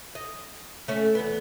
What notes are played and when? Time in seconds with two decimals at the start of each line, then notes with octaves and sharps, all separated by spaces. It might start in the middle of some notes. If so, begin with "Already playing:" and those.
0.15 D#5
0.88 A3 C#4
1.15 E2 B3